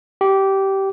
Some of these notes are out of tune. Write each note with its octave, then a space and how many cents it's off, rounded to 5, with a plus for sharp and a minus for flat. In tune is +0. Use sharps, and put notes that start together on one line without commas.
G4 -15